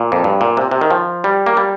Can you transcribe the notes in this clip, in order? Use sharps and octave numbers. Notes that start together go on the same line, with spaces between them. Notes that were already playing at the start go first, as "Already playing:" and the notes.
Already playing: A#2
F2
G2
A#2
C3
C3
D#3
F3
G3
A#3
G3